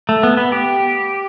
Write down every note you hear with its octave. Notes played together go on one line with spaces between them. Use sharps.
A3
B3
B3
G4